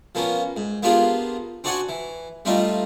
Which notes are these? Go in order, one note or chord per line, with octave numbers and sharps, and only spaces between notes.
F3 A#3 B3 C#4
G#2
A#3 B3 D4 F4 G4 G#4
C4 D4 F#4 D5 F#5 G#5
E3
G3 A3 C4 D4 D#4 F4